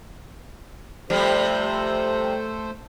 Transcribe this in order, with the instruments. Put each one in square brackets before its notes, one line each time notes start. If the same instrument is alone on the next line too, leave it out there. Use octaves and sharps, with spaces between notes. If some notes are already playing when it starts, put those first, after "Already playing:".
[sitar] C3 F3 G3 [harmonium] A3 A4 C5